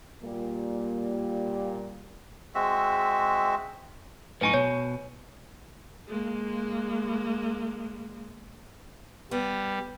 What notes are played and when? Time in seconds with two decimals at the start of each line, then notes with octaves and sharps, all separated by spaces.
0.23 A#2 G3 A#3
2.55 G#3 C4 F#4 E5
4.41 F#2 A2 D#4 B4 G#5 C#6
4.54 B2 C#5
6.08 G#3 A#3
9.31 G3 B3